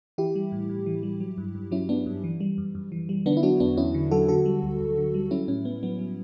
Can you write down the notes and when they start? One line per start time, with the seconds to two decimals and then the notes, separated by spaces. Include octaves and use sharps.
0.18 E3 E4 G4
0.35 G3
0.52 A2
0.69 A2
0.86 E3
1.03 G3
1.20 F#3
1.38 G2
1.55 G2
1.71 F#3 C#4 E4
1.89 F#3 B3 D4
2.06 G2
2.24 E3
2.40 G3
2.58 F#2
2.75 F#2
2.92 E3
3.09 G3
3.26 D3 B3 D4
3.37 E4
3.43 F#3 D4 F#4
3.60 E2 B3 D4
3.77 E2 C#4 E4
3.94 D3
4.11 F#3 F#4 A4
4.28 D3 F#4 A4
4.45 G3
4.63 D2
4.80 D2
4.98 D3
5.14 G3
5.31 F#3 C#4 E4
5.48 A2 C#4
5.65 A2 B3
5.83 F#3 B3
5.99 F#3